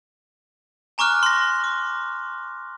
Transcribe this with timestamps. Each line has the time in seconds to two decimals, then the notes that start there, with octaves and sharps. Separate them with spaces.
0.98 G#5 A#5 C#6 D6 F6 F#6
1.23 C6 A#6
1.64 D6